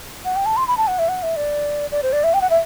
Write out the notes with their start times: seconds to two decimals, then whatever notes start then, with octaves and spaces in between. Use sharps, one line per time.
0.25 F#5
0.36 G5
0.46 A5
0.57 C6
0.67 B5
0.77 A5
0.87 F#5
0.99 E5
1.08 F#5
1.23 E5
1.36 D5
1.91 D5
2.03 C5
2.12 D5
2.24 E5
2.34 G5
2.41 F#5
2.50 E5